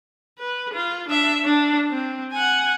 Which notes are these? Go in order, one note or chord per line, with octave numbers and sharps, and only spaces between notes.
B4
F4
D4 E5
D4
C4
F#5 G#5